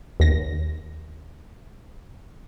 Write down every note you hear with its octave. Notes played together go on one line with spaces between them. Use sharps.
D#2 A#6